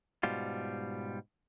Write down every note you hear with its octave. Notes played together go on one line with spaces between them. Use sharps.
G#2 B2 G3 F4